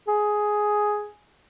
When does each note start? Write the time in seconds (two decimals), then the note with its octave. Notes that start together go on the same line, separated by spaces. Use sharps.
0.08 G#4